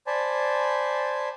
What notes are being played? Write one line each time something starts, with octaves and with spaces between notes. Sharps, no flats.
C5 D5 G#5 A5 B5